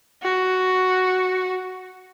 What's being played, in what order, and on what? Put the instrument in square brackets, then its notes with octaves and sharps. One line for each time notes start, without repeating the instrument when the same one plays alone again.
[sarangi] F#4